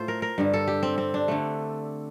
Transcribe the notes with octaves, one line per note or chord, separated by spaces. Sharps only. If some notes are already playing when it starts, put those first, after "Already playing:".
Already playing: A2 A3 F4 C5
A#4
A#4
G2 D3 G3
A4
G4
C4
C4
D4
D3 A3